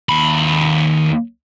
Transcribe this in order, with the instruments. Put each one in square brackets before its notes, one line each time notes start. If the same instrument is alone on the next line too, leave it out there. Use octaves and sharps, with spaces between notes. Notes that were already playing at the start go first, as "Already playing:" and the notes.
[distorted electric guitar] D#2 B5